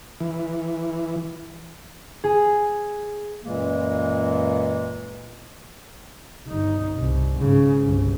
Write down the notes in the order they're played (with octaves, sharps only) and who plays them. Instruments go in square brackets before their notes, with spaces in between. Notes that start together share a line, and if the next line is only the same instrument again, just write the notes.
[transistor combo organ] E3
[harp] G#4
[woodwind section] F#2 A#2 E3 G#3 A#3
[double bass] G1 D#4
C2
G#2 C#3
G1 C2